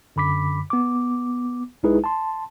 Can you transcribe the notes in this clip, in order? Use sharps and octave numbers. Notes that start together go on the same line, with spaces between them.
F#2 D3 B5 D6 B6
B3 D6
B1 G#3 D#4 E4 G#4 B4
A5 C6